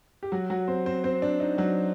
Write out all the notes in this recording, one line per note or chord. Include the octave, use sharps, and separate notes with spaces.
G4
F#3 F#4
F#3 F#4
C4 C5
C4 C5
C4 C5
D4
D#4
F#3 F#4